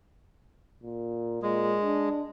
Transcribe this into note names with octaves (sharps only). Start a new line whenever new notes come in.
A#2
A#2 G#3
D4